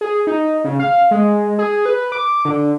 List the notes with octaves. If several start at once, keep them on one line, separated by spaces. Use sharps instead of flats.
G#4
D#4
C#3
F5
G#3
G#4
B4
D6
D3